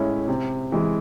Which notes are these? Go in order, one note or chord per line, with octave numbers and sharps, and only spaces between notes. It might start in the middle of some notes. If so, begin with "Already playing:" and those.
Already playing: A2 G#3 C#4 E4
C3
E3 G#3